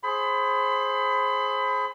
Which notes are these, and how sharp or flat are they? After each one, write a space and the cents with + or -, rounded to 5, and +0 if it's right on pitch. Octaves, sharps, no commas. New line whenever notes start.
G#4 +15 C5 +20 B5 +30